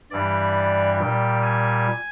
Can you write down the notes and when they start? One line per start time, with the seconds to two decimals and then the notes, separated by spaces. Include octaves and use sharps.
0.11 G2 E3 G3 D5
0.99 A#2 G3 G5
1.43 G#5